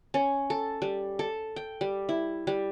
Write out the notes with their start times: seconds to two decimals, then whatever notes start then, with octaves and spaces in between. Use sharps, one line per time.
0.14 C#4
0.50 A4
0.82 G3
1.19 A4
1.56 G5
1.81 G3
2.09 E4
2.47 G3